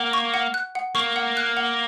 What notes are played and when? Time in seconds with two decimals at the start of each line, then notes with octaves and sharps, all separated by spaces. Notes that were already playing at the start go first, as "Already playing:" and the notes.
Already playing: A#3 F#5
0.13 C#6
0.34 F#5
0.54 F#6
0.75 F#5
0.95 A#3 C#6
1.16 F#5
1.37 F#6
1.57 F#5